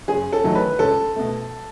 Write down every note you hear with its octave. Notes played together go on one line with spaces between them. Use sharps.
F#1 G#4
A4
E2 D#3 F#3 A3
B4
C#2 A4
B2 A3